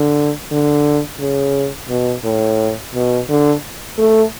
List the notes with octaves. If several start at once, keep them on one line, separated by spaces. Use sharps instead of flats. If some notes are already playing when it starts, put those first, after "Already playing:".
Already playing: D3
D3
C#3
B2
A2
B2
D3
A3